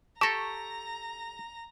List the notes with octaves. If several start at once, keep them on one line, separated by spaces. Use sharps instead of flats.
G4 A4 A5 A#5 C#6 A#6